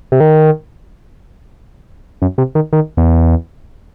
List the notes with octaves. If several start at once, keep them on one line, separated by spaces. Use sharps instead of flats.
C3
D#3
F#2
C3
D#3
D#3
E2